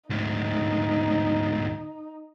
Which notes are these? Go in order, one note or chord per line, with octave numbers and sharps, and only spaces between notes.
D2 G#2 D#4